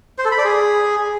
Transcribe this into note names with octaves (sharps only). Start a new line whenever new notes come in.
C5
A4
B5
D5
G#4